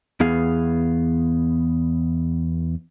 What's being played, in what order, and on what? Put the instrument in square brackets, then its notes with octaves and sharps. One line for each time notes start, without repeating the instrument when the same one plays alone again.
[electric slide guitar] E2 B3 G#4 F5